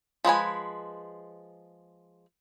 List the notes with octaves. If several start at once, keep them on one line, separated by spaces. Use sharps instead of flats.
F3 G#3 B4 G#5